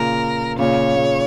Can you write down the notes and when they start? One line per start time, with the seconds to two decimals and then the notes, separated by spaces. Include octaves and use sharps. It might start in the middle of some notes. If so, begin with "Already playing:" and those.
Already playing: A#2 C#3 A#4
0.59 A#2 C#3 C#5
0.96 A#2 C#3